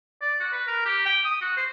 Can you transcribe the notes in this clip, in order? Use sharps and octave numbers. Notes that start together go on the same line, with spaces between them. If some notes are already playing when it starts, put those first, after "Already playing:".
D5
F#4
B4
A#4
G4
G5
D#6
F#4
C5